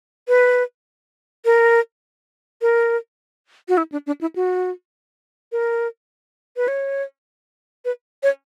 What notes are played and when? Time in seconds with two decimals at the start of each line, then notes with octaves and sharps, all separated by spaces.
0.28 B4
1.45 A#4
2.62 A#4
3.69 F#4
3.77 E4
3.92 D4
4.07 D4
4.21 E4
4.36 F#4
5.52 A#4
6.57 B4
6.68 C#5
7.85 B4
8.23 C#5